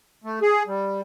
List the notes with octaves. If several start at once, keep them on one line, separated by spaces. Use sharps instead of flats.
A3
G#4
G3